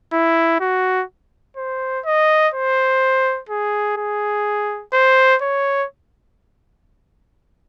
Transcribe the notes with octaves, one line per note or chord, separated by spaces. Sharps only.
E4
F#4
C5
D#5
C5
G#4
G#4
C5
C#5